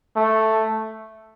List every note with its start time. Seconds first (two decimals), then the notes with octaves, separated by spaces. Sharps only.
0.16 A3